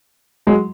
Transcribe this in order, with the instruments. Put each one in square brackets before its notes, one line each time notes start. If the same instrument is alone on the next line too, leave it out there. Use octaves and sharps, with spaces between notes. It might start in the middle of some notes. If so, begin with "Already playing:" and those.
[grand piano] F#3 G#3